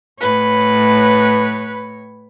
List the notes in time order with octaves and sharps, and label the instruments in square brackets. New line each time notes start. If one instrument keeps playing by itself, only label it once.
[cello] A2 C#5 [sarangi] B4